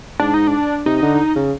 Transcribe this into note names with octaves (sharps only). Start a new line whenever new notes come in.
G#2 D4
D#4
D4
C3 D#4
D3
C#3